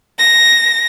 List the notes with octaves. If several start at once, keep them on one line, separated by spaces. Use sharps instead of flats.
A#6